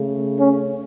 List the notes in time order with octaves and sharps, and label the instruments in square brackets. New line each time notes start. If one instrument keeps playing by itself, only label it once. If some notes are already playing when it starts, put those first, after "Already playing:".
Already playing: [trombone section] C#3 A3
C#4